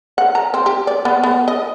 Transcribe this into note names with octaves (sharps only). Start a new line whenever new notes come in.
F#5
A#5
C4
G4
D5
B3
B3
D#5